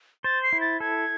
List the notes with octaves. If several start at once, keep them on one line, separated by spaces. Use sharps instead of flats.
C5 A6
C7
E4
A6
A4 G#6